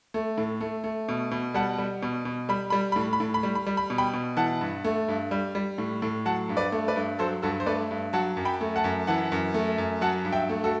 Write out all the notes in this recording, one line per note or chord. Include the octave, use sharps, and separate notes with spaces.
A3
A2
A3
A3
B2
B2
G3 F#5 A5
G3
B2
B2
G3 B5
G3 B5
A2 B5
B5
A2
B5
G3
B5
G3
B5
B2
G5 B5
B2
E3 F#5 A5
G2
A3
G2
G3
G3
A2
A2
F#3 F#5 A5
G2
B4 D5
A3
B4 D5
G2
F#3 A4 C5
G2 F#4 A4
C5
A3 B4 D5
G2
F#3 F#5 A5
F#2
G5 B5
A3
F#5 A5
F#2
E3 F#5 A5
F#2
A3
F#2
F#3 F#5 A5
G2
E5 G5
A3
F#4 A4